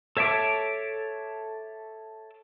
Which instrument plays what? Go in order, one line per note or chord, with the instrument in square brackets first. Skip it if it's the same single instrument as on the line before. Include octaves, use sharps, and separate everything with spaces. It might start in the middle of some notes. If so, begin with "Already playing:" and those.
[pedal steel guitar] A4 C#5 E5 A5 D6